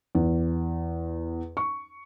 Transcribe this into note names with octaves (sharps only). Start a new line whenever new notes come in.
E2
C#6